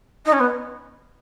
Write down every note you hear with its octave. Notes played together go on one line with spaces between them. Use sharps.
D#4
C#4
B3